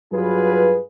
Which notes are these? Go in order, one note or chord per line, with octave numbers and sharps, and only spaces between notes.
G2 F#3 F4 G#4 B4